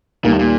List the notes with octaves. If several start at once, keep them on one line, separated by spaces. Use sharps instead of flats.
D#2 A#2 D#3 G3
A2
A#2